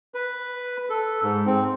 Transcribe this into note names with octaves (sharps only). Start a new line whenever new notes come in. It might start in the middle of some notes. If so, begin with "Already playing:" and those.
B4
A4
G#2
C4